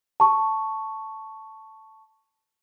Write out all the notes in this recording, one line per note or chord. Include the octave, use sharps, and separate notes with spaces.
A5 C#6